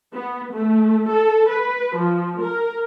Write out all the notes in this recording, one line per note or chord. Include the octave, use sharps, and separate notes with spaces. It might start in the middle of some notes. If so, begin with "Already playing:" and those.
B3
A3
A4
B4
F3
A#4